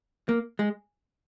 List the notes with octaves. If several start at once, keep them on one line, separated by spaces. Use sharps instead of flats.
A#3
G#3